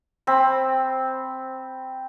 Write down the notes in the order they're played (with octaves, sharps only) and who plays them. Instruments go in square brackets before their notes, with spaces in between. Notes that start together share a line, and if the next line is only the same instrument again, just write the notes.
[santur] C4 B5